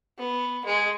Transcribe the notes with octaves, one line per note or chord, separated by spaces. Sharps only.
B3
G#3